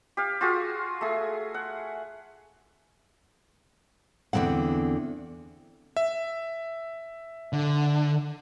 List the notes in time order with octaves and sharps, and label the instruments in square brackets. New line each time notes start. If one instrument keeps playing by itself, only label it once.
[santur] G4 F5
F4 F#4 G#4
A3 G#4
F#5
[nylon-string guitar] E2 D3 F#3 C4 F#5
[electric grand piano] E5
[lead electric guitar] D3